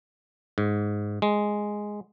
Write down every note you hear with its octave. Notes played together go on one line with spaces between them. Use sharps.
G#2
G#3